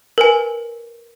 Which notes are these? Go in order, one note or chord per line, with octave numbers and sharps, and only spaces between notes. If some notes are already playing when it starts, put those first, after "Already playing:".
A#4 B4 G#5